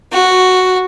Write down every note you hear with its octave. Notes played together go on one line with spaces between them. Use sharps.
F#4